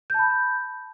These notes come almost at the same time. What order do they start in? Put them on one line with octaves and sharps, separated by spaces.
G6 A5 B5